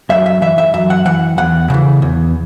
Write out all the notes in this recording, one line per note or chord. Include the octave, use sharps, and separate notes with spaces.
F#2 E5
E5
E3 E5
E5
F#2 E5
F#5
E3 F#5
E2 F#5
C#3 E3
E2